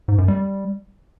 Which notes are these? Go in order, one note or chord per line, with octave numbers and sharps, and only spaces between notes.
G#2
F#2
G3